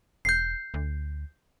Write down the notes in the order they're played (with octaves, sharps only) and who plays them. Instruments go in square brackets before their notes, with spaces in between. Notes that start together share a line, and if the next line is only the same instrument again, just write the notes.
[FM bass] E1 [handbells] G6 C7
[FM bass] D2